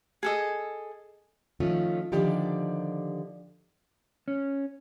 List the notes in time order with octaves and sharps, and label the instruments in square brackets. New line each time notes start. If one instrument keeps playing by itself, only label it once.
[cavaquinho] G#4 A4 D#5
[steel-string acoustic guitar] D#3 F3 A3 C#4 F4
D3 D#3 F3 G4 D5
[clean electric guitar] C#4